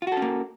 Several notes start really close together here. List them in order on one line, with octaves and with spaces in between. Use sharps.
F4 F#4 A4 C#4 A#3